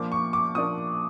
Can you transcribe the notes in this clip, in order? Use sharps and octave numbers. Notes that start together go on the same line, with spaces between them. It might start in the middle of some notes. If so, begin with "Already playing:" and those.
Already playing: A#2 F3 A#3 D4 D6
C#6
D6
A#2 F3 A#3 D4 D#6